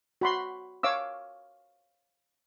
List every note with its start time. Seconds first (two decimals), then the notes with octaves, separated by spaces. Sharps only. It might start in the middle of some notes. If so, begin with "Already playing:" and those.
0.21 F#4 B5 C6
0.83 C#5 F5 D6 E6